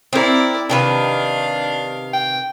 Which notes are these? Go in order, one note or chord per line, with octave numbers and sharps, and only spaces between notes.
C4 E4 A#4 D5
C3 D#3 D4 B4 F5
G5